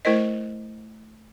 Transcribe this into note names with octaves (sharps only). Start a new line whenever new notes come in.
A3 E4 A#4 C5 D#5